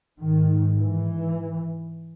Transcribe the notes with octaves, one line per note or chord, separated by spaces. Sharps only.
G#2 D#3
E3